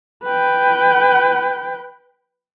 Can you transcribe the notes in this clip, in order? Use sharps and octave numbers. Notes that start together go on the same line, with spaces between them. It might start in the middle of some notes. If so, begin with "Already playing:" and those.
B4 G5